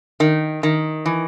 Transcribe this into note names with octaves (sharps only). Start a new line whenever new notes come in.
D#3
D#3
E3